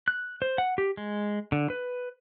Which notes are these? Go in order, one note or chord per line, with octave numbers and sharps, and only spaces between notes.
F#6
C5
F#5
G4
G#3
D3
B4